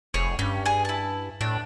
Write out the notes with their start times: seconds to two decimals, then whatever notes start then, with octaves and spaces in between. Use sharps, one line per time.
0.14 F1 G#4 C#5
0.39 G2 C#4
0.66 G#4 G#5
0.85 E4 A5
1.41 A2 D4